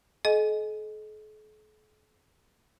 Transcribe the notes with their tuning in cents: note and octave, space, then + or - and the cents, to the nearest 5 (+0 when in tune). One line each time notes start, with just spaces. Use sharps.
A4 -45 D#5 +0 G#5 +15